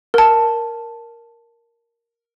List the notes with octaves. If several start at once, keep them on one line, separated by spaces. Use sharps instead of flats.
A#4 A5